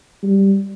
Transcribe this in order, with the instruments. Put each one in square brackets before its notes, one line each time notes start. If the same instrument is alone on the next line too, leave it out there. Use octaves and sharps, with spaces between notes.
[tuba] G3